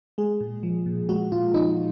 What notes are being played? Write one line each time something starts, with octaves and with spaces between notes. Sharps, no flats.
G#3 G#4
A#2
F3
A#2
G#3 F#4
A#2 F4
F3 D#4